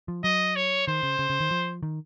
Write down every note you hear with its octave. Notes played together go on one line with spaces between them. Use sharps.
F3
F#3 D#5
C#5
D#3 C5
C#3
C#3
C#3
D#3
F3
D#3